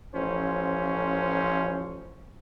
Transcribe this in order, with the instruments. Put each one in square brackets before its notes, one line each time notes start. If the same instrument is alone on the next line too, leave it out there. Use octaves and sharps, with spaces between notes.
[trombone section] A1 F3 C#4 C5